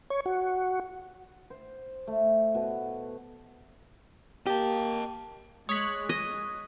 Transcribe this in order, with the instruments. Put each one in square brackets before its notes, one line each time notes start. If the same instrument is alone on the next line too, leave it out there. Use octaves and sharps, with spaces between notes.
[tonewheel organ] C#5
F#4
[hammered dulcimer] C5
A3
B2
[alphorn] A#3 [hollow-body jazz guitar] G4 [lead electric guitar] D#5 A5
[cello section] G#3 [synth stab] C#5 F#6 [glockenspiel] D#6 B6
[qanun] D#5